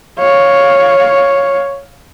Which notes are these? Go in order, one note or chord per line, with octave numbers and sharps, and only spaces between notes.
C#5 F5